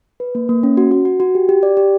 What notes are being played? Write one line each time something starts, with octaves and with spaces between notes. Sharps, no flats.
B4
A#3
A#3
C#4
F#4
F#4
F#4
F#4
G4
G4
D5
G4